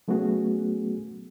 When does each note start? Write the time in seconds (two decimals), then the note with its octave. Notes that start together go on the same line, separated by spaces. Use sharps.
0.08 F#3 A3 B3 C#4 F#4 G#4